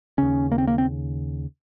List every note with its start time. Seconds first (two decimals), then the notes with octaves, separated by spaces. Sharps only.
0.18 D#2 C#3 C#4
0.52 A#3
0.58 C4
0.67 A#3
0.78 C4